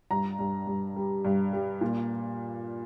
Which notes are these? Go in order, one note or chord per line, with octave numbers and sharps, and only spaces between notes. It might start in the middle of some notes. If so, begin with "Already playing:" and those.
G2 A#5
G2
G2
G3
G2
G3
A#2